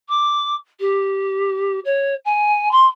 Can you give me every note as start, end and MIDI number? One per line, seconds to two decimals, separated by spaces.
0.09 0.55 86
0.80 1.80 67
1.85 2.15 73
2.25 2.71 80
2.71 2.86 84